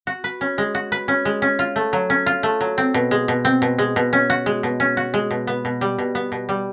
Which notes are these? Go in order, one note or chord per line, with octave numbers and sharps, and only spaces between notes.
F#4
B4
C#4
G#3
F#4
B4
C#4
G#3
C#4
F4
A3
F#3
C#4
F4
A3
F#3
C4
B2
G#3
B2
C4
B2
G#3
B2
C#4
F#4
G#3
B2
C#4
F#4
G#3
B2
B3
B2
G3
B2
B3
B2
G3